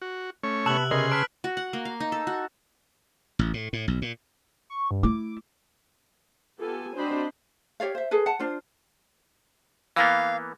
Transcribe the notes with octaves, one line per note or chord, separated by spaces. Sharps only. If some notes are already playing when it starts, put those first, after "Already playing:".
F#4
A3 C#4 C#5
C3 B3 A5 E6 F#6 F#7
C#3 B3 G#4 A#4 D#5 C6
B4 A5 F6 B6 D7
F#4
F#5
A#3
F5
D#4
A4
F#4
A1
A2
A2
B1
A#2
C#6
G2
A3 E4 D6
B3 F4 G4 A4 G#5
C4 D4 F#4 C5 D#5 B5
G4 C#5 D5 F5
C5 E5
G#4 A4 B4
F#5 A5
D4 F4 C5
E3 A#3 B3 F5